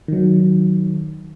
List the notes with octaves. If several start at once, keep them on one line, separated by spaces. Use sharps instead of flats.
D#3 F#3